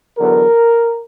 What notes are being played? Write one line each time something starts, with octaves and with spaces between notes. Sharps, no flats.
E2 D3 F#3 B3 A#4